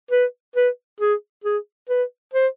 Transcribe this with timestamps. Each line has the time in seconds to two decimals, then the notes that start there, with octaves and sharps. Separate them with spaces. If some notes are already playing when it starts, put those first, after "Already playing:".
0.11 B4
0.56 B4
1.00 G#4
1.44 G#4
1.89 B4
2.33 C5